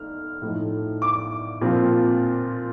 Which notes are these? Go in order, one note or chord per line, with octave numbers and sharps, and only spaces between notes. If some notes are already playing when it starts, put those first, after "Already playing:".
Already playing: A3 D#4 F6
A2 F3 A3 D#4
D6
A#2 F3 C4 F4